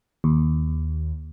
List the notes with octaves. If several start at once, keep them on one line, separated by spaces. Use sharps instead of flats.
D#2